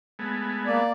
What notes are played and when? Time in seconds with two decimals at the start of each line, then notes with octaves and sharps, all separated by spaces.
0.19 G#3 A3 B3
0.66 A#3 D5